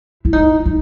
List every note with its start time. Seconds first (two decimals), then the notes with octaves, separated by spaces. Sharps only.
0.25 E4
0.33 D#4
0.66 D#4